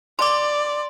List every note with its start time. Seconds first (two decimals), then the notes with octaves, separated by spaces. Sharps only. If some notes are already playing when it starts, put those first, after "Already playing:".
0.19 D5 C6 D6